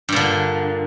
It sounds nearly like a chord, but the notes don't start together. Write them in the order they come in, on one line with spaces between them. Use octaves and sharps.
G2 A#2 D3